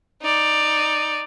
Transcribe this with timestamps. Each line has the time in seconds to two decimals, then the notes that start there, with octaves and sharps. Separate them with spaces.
0.22 D#4 D5